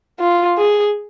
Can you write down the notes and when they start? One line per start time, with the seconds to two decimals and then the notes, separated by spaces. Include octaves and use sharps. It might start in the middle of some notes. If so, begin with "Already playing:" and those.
0.20 F4
0.57 G#4